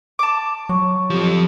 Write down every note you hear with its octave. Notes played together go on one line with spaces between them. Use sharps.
A5 D6
F#3 C#6
F2 F3 G4